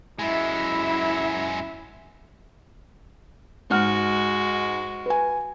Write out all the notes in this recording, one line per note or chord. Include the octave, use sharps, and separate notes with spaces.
F#2 G#3 E4 E5
G#2 G#3 F#4 F#5 F6
B4 G#5